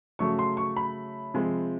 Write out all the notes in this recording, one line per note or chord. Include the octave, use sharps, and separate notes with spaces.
C#3 F#3 A3 C#6
C6
C#6
B5
C3 F3 G#3